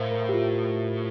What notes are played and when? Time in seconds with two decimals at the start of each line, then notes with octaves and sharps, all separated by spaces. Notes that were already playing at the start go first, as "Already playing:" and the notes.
Already playing: A2 A#4 C5 E5 F5
0.11 A#4
0.29 G4
0.34 F4